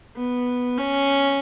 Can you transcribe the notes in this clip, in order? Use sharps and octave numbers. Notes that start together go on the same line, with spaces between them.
B3
C#4